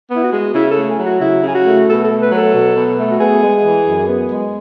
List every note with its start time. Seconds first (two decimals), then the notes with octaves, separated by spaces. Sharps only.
0.10 B3
0.16 E4
0.22 F#4
0.32 G#3
0.54 C#3 E4
0.71 A4
0.77 A3
0.88 G#4
0.99 F#3
1.05 F#4
1.20 C#3 E4
1.43 C#3 G#4
1.55 F#4
1.65 A3
1.87 B2 A4
2.04 A4
2.09 A3
2.20 B4
2.31 F#3 B4
2.36 A4
2.53 B2
2.76 B2
2.97 A3
3.10 F#4
3.20 B3 G#4
3.42 G#3
3.64 E3
3.86 F#2
4.07 B3
4.30 G#3